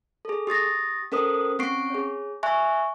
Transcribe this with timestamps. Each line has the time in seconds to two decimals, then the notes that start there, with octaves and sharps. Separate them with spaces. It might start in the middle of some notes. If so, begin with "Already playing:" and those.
0.25 G#4 A4
0.47 G4 D#6 A6 A#6
1.12 C#4 A4 A#4 C5 D#6
1.59 C4 C#4 C#6 C7 D7
1.90 G#4 C#5
2.43 E5 G#5 C#6 F#6